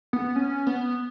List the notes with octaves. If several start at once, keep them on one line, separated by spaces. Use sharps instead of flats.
B3
C#4
B3